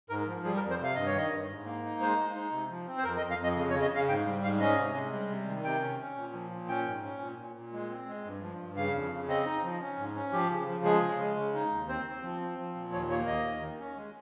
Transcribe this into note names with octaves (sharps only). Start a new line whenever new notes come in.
G#2 A#4
F3
G3 G#4
A#4
F2
C5
C3 F5
G2 D#5
C#5
D#3 D#5
G2
G#2
A#3
D#4
G#3 C5
G#3
D#4
C3
F3
C4
C5
F2 A#4
D#5
F2
F5
F2 D#5
C#3 D#5
C#5
C#3
D#5
C#3 F5
G#2 G5
G3
G#2 F5
C#4 D#5
C3
G#3
G3
C3
D#3
C3 G5
C#4
C#4
A#2
F3
A#2
C#4 G5
G#2
C#4
A#2
A#2
A#2
G#3
C4
G#3
G2
F3
G2
C#3 F5
F2
C#3
C4 D#5
D#4
F3
C#4
G#2
C#4
F3 G4
C#3
F3
G#3 G#4
C#3
G#3
C#3
D#4
D#2
C4 C5
C4
F3
C4
F3
A#2
D#2 C#5
A#3 C#5
D#2 D#5
D#3
D#3
C#4
G#3